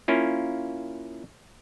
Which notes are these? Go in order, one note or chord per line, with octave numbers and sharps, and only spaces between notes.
A#3 C#4 E4 F4